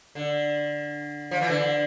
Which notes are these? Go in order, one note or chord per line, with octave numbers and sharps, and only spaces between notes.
D3
F3
E3
D3